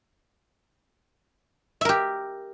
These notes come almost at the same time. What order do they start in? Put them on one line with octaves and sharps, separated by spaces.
E5 A#4 G4